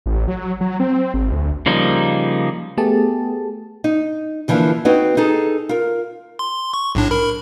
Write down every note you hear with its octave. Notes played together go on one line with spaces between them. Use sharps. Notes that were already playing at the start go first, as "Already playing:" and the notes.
A1
F#3
F#3
C4
G#1
D2
C#3 F3 G3 A#3 D#4
A3 B3 G4 G#4 A5
D#4
D3 E3 F3 A#3 D4
C4 D#4 F#4 B4 C#5
D#4 G#4 A4
F4 A#4
C6
C#6
B1 A2 D4
A#4 B5